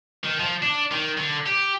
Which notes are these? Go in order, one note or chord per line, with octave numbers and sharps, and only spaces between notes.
D#3
F3
D4
D#3
D3
G4